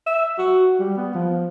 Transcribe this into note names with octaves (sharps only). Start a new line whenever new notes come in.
E5
F#4
G3
B3
F3